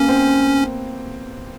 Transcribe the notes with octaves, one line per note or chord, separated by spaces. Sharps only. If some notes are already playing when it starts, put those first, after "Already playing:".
Already playing: A#3 B3 C#4
C4